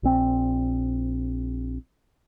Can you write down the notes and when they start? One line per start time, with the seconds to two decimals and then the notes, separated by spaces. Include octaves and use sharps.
0.03 A#1 C4